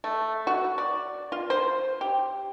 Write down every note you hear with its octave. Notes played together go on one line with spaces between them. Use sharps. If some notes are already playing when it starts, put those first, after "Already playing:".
A3
F#4
D5
F4
C5
G4